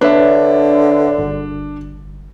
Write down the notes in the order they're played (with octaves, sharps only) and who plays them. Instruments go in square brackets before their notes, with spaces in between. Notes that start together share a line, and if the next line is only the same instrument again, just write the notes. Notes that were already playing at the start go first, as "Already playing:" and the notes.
[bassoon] D3 [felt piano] D4 [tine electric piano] B4 C#5 E5
[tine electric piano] G1